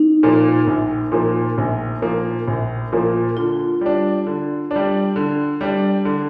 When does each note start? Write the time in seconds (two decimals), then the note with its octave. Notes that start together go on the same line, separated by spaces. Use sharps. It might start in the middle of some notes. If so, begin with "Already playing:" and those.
Already playing: D#4
0.23 A#2 F3 A#3
0.67 A#1
1.12 A#2 F3 A#3
1.58 A#1
2.02 A#2 F3 A#3
2.48 A#1
2.92 A#2 F3 A#3
3.37 D3 F4
3.81 G3 D4
4.27 D3
4.71 D4
4.76 G3
5.16 D3
5.61 G3 D4
6.05 D3